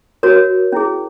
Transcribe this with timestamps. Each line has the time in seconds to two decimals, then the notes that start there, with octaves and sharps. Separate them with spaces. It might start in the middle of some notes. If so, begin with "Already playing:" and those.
0.23 F#4 A#4 C#5
0.72 C#4 E4 G#4